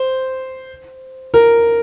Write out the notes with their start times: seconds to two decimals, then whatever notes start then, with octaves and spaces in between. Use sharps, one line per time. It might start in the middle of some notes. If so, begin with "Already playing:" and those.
Already playing: C5
1.34 A#4